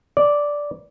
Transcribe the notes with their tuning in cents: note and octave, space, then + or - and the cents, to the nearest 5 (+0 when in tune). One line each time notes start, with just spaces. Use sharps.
D5 -5